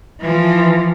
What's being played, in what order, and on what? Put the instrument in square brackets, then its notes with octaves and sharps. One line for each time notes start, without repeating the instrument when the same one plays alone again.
[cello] E3 F3